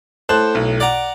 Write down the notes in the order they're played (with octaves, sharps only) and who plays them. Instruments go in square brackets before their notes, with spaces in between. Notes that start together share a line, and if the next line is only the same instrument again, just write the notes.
[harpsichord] A2 [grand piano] C5 A5 F#6
[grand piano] B1
[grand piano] D5 [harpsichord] F#5 A#5 D6